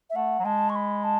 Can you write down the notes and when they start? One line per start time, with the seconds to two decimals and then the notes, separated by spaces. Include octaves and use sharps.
0.09 E5
0.15 A3 F#5
0.39 F#3
0.44 G#3 A5
0.69 C#6
0.75 B5
1.04 A5